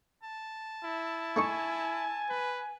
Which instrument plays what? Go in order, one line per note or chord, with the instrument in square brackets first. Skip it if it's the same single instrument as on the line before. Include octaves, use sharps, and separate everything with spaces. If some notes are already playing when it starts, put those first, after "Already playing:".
[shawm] A5
[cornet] E4
[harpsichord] A3 D#4 C#6 [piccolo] G#5
[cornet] B4